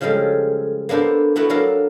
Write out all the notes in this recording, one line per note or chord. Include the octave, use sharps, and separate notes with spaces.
C#3 F3 G3 G#3 A4
A#3 B3 D4 A4 C5
A3 B3 E4 F#4
F#3 D4 A4 A#4 F5